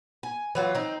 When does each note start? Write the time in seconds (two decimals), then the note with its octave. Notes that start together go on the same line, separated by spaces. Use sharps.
0.23 G#5
0.55 E3 F#3 F4
0.75 C4 D#4